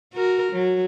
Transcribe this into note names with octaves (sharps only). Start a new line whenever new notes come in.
F#4 A#4
F#3